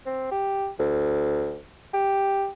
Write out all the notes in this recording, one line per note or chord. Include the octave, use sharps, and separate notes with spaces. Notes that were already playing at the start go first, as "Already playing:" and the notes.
C4
G4
D2
G4